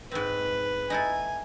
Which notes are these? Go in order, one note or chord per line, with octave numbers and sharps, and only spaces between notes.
G#2 C4 B4
D#4 E4 A4 G#5